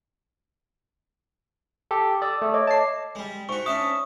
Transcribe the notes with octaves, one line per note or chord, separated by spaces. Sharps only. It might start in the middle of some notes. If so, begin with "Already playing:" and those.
G4 A4
D5 D#6 E6
A3
C#5 D#5 D6
A5 C7
G3 G#3
G#2 F#4 C#6
C#4 D4 E5 D#6